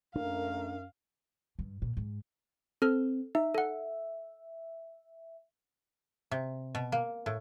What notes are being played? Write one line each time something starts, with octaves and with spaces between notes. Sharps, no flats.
A#1 F#2 A3 D4 A#4 F5
G2
A#2
G#2
C4 A4 F6
D#4 E5
A4 F#5
C3
B2
A#3
A2